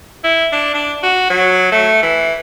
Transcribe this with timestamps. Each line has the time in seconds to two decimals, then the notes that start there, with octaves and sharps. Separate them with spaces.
0.24 E4
0.52 D4
0.74 D4
1.03 F#4
1.30 F#3
1.72 A3
2.03 E3